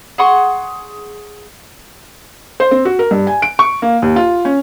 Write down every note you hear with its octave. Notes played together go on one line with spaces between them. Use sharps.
G#4 F#5 C6 C#6
C5
C4
F#4
A#4
G2
G#5
D7
C#6
A#3
D#2
F4
C#4